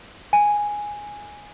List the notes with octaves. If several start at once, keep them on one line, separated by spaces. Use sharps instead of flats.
G#5